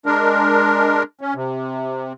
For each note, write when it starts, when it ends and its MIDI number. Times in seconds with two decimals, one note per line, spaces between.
0.06 1.03 56
0.06 1.03 62
0.06 1.03 70
1.21 1.34 61
1.35 2.13 48